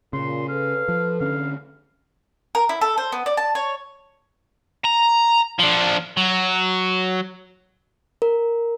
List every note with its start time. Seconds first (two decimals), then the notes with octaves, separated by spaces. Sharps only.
0.13 A#2 C#3 C6
0.49 A4 B4 F5
0.88 F3
1.21 D3 C#4 D4 F5
2.55 A#4
2.69 E4
2.81 A4
2.98 C5
3.12 B3
3.26 D5
3.37 A5
3.55 C#5
4.85 A#5
5.60 F3 D4
6.17 F#3
8.22 A#4